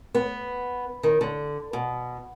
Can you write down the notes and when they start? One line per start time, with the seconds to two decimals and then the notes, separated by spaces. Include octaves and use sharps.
0.15 B3
1.03 D#3
1.21 D3
1.73 B2